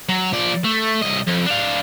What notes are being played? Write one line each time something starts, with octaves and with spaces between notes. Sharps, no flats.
F#3
F3 D5
A3
C2 D#5
F2
D4 F5